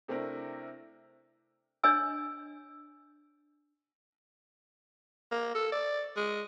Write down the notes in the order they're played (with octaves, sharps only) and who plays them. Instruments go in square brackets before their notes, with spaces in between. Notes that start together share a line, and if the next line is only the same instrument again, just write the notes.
[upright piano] C3 A3 C4 D4 E4 A#4
[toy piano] D4 C#5 D#5 G#5 E6
[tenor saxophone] A#3
A4
D5
G#3